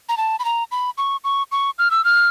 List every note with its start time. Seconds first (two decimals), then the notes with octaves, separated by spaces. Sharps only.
0.09 A#5
0.17 A5
0.39 B5
0.45 A#5
0.72 B5
0.98 C#6
1.24 C#6
1.52 C#6
1.79 F6
1.91 E6
2.05 F6